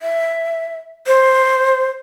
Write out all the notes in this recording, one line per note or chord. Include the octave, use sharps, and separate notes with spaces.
E5
C5